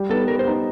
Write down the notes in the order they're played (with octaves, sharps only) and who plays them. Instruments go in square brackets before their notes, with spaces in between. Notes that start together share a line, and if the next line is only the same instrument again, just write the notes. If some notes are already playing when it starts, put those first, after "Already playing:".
Already playing: [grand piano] G3
[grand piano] B3 D#4 [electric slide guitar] A4
[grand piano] G3 [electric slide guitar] A#4
[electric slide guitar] C5
[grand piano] B3 D#4